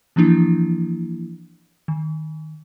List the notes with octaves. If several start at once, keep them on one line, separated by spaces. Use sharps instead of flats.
E3 F3 A#3 D4 E4
D#3